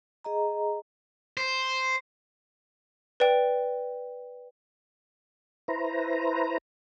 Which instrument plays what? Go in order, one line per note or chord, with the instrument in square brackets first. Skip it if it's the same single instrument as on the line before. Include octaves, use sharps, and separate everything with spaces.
[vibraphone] G#4 D#5 A#5
[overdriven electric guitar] C5
[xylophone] B4 D5 G5
[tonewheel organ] E4 B4 C5 A#5